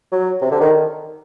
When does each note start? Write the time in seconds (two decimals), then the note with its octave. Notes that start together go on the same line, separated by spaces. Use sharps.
0.12 F#3
0.41 C3
0.52 D3
0.61 D#3